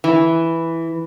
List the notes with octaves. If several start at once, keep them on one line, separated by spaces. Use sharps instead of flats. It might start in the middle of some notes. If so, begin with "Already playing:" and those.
E3